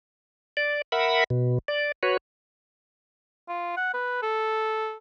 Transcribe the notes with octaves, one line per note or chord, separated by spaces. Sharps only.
D5
A#4 E5 F#5 B5
B2
D5
F#4 B4 C#5
F4
F#5
B4
A4